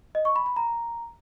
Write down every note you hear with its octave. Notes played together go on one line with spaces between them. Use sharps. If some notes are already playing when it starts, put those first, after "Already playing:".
D#5
C#6
B5
B5
A#5